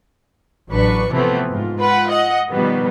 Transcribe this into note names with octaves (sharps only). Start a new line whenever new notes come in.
A1 F#3 D4 B4 C#6
C3 E3 F3 A3 B3 C4
G#2 F4
F4 B4 F#5
D#5 F#5
B2 D#3 F3 G3 B3